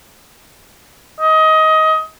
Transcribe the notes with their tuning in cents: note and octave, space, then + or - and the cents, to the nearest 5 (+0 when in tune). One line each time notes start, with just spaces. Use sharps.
D#5 +20